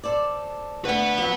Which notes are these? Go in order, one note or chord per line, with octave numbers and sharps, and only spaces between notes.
A4 C5 D5
D3 A3 B4 F#5
F3 F#3